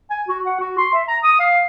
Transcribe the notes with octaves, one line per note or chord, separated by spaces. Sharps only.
G#5
F#4
F#5
F#4
C6
E5
A#5
D#6
F5